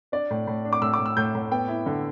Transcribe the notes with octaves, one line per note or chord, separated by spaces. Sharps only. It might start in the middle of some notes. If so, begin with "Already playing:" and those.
D4 D5
A2
A2
D4
D6
A2 E6
D6
A2
E6
A2 G6
A2
B3 G5
E4
D3